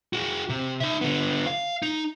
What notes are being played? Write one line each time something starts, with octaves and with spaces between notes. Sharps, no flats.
F#4 G#4
C3
D#4 E5
D3 B3
F5
D#4